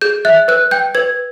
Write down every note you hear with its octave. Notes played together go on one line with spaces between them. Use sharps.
G#4 G6
E5 F#6
B4 F#6
G5 G6
B4 G#6